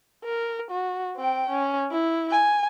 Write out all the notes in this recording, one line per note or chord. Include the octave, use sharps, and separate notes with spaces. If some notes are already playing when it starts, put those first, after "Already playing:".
A#4
F#4
C4 G5
C#4
E4
G#5